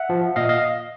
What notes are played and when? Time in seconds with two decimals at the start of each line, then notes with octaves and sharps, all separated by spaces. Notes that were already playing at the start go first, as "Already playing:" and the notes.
Already playing: E5 F#5
0.10 F3
0.36 A#2 D#5 F5
0.49 D#5 F5